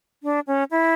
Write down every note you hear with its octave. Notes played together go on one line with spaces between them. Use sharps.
D4
C#4
E4